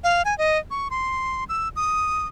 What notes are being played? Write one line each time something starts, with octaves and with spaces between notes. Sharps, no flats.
F5
G#5
D#5
C#6
C6
E6
D#6